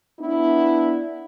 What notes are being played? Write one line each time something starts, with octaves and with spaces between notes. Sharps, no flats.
B3 D4 E4